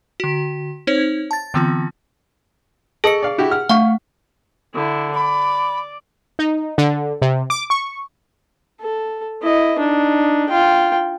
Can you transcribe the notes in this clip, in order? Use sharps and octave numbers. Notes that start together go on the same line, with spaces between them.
D3 F#4
C4 D#4 C5 C#5
A5 A6
D3 E3 B3 C4 F4
G#4 A4 D#5 C#7
D5 F5
E4 F#4 G4
F#5 F6
A3 F5 F#5 C#6
D3 E4
D5 B5
D#4
D3
C3
D6
C#6
A4
E4 D#5
D4 D#4
F4 G5